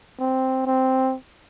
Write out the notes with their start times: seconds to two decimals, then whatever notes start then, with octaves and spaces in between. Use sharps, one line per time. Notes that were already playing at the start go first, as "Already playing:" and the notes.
0.20 C4
0.67 C4